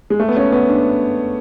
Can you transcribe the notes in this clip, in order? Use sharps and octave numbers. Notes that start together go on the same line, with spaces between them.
G#3
A3
B3
C#4
B3
D4